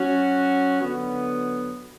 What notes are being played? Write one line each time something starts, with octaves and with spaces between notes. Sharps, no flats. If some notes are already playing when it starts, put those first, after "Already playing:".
Already playing: F#3 C#4 F#4
D3 F#3 B3